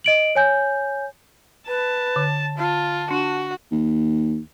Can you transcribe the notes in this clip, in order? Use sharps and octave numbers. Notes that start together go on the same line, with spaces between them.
D#5 D7 F#7
C#5 G#5 G6
B4 A5
D3
F4 A5
D4 F#4
D#2